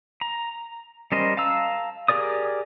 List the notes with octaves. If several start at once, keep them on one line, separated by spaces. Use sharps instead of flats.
A#5
G3 C#4 A#4 C5 D#5
F5 A5 A#5 E6
G4 G#4 A#4 D5 D#6